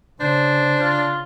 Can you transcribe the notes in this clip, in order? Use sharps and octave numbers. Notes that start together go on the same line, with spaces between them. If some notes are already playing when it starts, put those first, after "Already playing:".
C#3 D4 C5
F4